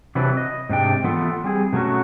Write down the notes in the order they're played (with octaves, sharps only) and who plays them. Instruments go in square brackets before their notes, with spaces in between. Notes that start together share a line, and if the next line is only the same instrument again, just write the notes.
[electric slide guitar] C3 E3 F#3 D4 B4
D#5
G#2 C3 D4 G5
E3 B3 F4 A4
G3 C4 G#4
B2 F#3 A3 C#4 F#4